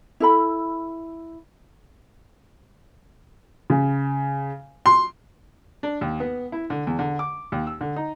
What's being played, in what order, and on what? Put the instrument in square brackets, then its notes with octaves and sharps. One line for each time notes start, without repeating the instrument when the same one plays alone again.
[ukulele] E4 A4 B5
[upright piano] C#3
C6
[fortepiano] D4
D#2
B3
E4
D3
E2
D3
D6
D#2
E6
D3
D#4